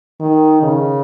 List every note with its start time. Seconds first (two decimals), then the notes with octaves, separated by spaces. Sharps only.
0.20 D#3
0.63 C#3